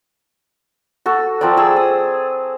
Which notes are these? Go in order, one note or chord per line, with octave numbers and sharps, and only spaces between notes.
F#4 A4
F3 C4 A#4 D5
G#4 A4 E6
D#6